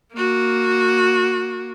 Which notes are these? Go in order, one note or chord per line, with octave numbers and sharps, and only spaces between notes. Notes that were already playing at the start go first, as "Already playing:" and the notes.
A#3 F#4